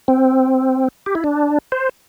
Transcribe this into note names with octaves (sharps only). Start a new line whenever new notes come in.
C4
G4
E4
D4
C5